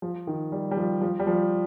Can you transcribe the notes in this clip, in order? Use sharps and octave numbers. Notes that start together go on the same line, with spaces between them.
F3
D#3
G3
G3
F3
F3
G3
F3